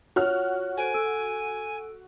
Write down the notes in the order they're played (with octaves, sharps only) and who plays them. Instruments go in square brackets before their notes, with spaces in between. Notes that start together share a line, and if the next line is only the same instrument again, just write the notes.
[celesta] F4 C#5 [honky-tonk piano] F#4 F6
[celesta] A4 C5 D7 [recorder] G#5
[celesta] A4 E6 D7